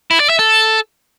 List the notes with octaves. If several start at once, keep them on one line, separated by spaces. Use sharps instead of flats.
E4
D5
E5
A4